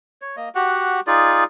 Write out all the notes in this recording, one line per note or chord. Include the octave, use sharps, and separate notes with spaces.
C#5
A#3 D#5
F#4 G4 F#5
D#4 F4 G#4 D5